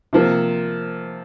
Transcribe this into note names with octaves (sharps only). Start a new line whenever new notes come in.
C3 F3 A#3